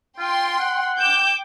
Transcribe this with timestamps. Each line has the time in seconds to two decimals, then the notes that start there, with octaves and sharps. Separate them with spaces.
0.19 F4 G5 C6
0.59 F#5
1.01 G5 D6 G6 E7